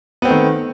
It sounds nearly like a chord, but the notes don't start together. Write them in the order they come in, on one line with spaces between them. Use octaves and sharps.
B3 C4 A3 D#3